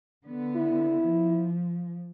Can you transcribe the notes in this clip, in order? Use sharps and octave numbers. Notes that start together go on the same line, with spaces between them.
D3 B3
E4
F3